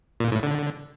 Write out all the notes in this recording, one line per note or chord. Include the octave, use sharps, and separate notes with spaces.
A#2
A2
D3